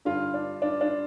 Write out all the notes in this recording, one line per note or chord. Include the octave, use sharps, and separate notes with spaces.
G2 D3 F4
D4
D4
D4